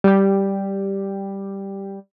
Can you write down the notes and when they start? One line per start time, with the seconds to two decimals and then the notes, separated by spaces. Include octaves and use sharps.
0.04 G3 G4